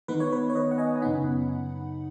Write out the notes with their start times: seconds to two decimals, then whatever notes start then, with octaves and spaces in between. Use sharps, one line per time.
0.08 D#3 B3 D#4 B4
0.20 C#5
0.32 B4
0.50 C#5
0.55 B4 D#5
0.71 F#5
0.78 D#5 G#5
0.96 G#5
1.02 F#2 C#3 B3 D#4 F#5 B5